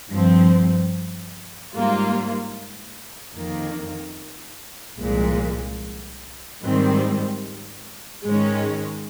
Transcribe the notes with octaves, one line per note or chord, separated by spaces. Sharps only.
G2 F3 C4
G#2 G3 A#3 F4
F2 D#3 A#3
C2 A#2 F3 G#3
G#2 D#3 G3 C4
G#2 D#3 G#3 C#4